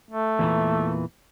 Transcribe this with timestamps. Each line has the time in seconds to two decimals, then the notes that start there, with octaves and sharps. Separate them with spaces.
0.11 A3
0.39 E2 A#2 E3